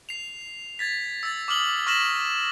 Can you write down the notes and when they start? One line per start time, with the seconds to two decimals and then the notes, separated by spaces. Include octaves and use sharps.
0.09 C7 F7
0.79 G#6 A6 B6
1.23 E6 A6
1.48 D6 D#6 F6 F#7 G7
1.87 C#6 F6 A#6 B6 E7 F#7